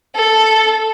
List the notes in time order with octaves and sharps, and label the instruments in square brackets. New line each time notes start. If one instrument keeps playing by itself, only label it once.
[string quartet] A4